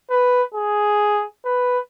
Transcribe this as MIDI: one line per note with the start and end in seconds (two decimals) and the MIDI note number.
0.11 0.42 71
0.54 1.26 68
1.45 1.79 71